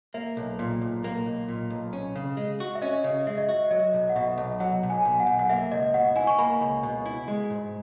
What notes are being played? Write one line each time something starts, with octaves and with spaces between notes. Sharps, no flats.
A#3 E5
B1
A#2
B1
A#3
B1
A#2
B1
C#4
C#3
G#3
F#4
E5
C#4 D#5
C#3
G#3 E5
D#5
F#4 E5
F#3 D#5
B1
F#5
B2 E5
B1
F#3 F#5
B1
G#5
B2
F#5
B1
F#5
A#3 E5
C#2 D#5
B2 F#5
E4 G#5
C#6
A#3 B5
C#2
B2
E4
G#3
G#2